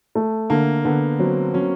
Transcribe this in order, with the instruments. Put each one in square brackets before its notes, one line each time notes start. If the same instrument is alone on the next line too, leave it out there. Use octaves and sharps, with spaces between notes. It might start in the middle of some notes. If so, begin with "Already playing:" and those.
[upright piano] A3
[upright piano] D3 [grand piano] A#3
[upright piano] D3 [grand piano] B3
[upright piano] F#3 [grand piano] C4
[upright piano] F#3 [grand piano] C#4